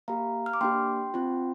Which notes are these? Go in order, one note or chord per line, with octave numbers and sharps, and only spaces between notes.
A#3 G4 F5 A#5
F6
D6
A#3 D4 G4 G5 C6
C4 F4